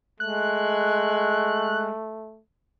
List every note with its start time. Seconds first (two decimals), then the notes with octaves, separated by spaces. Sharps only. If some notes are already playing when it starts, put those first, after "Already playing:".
0.20 G#3 A3 F#6